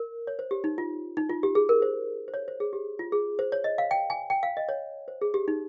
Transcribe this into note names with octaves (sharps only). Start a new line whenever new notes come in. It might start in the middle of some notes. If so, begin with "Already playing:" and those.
Already playing: A#4
C#5
C5
G4
D#4
F4
D#4
F4
G4
G#4
A#4
C5
C5
C#5
C5
G#4
G4
F4
G#4
C5
C#5
D#5
F5
G5
G#5
G5
F5
D#5
C#5
C5
G#4
G4
D#4